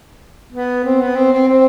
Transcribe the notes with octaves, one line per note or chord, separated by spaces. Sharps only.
B3
C4
B3
C4
C4
C4